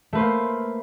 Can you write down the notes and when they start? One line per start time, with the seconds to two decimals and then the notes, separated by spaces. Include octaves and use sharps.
0.13 A3
0.15 B4
0.18 C5
0.20 A#3